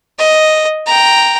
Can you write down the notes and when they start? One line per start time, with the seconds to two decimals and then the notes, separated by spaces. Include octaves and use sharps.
0.19 D#5
0.87 G5 A#5